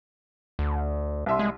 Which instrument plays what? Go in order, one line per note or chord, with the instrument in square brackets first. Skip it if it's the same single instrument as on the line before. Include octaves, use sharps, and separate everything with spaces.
[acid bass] D2
[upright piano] C2 E5 C6
[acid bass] G#3